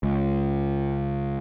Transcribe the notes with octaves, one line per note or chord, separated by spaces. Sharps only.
C#2